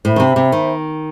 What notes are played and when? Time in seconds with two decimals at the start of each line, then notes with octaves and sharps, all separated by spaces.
0.04 A2 C5 E5 B5
0.16 D#3
0.20 C3
0.36 C3
0.52 D#3